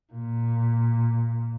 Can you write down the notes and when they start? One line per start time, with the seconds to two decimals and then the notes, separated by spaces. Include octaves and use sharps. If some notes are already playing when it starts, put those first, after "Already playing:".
0.13 A#2